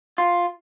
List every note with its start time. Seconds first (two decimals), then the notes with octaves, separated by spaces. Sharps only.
0.18 F4